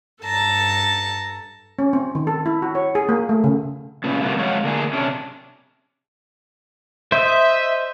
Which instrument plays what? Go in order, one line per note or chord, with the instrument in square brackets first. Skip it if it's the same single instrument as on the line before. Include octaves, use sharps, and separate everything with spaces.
[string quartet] G2 A4 A5 A#5
[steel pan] C#4
C4
D#3
A4
E4
F#4
C#5
G#4
A#3
A3
C#3
[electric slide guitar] A#2 C#3 B3
C3 G3 A#3 B3
F2 G#3 C#5 F5 F#5
D3 A#3 D4 G#4
C3 C#4 D4
[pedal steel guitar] C5 D#5 [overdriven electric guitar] E5